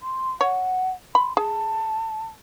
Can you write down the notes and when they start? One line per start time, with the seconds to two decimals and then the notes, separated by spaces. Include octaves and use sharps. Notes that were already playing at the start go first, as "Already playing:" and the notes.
0.02 C6
0.41 C#5 F#5
1.15 B5 C6
1.37 G#4 A5